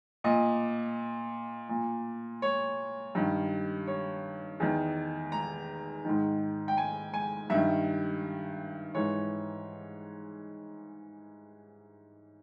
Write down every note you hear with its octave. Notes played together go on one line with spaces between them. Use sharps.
A#2 D#5
A#2
C#5
G2 D#3
C#5
E2 D#3
A#5
G#2 D#3
G5
G#5
G#5
G2 D#3 E5
G#2 E3 C#5